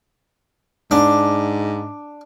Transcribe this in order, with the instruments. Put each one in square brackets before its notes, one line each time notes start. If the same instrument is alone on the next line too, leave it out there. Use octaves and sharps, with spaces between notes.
[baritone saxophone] G#2 [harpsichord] D4